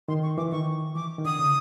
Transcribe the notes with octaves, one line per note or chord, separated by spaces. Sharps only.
D#3 C6
C#6
E3 D6
D#3 C#6
E3 D6
D#3
D3 D#6
C#3